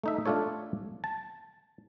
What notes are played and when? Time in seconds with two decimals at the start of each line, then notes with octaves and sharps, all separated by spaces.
0.03 A3 D#4 E5
0.26 A3 D4 F4 A4 C#5
1.04 A5